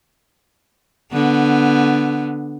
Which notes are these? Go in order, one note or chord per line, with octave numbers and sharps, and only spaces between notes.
D3 B3